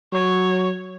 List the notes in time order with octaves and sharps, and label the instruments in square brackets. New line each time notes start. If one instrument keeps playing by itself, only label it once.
[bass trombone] F#3 [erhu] C#5